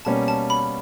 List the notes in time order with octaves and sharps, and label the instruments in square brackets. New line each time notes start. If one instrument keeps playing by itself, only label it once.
[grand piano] B2 G3 A#3 C#4 [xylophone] A5
[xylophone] A5
B5